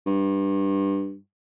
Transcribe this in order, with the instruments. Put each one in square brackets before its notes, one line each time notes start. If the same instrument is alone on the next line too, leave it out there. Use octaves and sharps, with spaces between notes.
[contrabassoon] G2